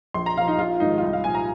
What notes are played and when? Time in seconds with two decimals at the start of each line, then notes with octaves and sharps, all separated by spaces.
0.14 A#1 C6
0.26 A#5
0.37 A#2 F3 F5
0.48 D#4
0.58 A#1 F4
0.80 G#2 D#3 D#4
0.98 F4
1.02 C2 D#4
1.13 F5
1.24 A#2 F3 G#5
1.35 A#5